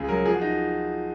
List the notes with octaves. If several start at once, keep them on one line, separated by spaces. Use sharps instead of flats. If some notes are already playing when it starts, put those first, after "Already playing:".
Already playing: C#2 G#4
F#3 A#4
F3 G#4
F#4
D#4